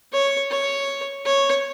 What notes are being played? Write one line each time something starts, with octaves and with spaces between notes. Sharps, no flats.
C#5
C#5
C#5